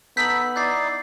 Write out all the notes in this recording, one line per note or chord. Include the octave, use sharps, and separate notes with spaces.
B3 D#4 A4 G6 B6 F#7
D#4 E4 D5 G6 A6 C7